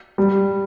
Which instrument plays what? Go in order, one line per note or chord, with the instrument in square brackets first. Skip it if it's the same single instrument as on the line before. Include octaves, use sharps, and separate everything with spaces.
[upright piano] G3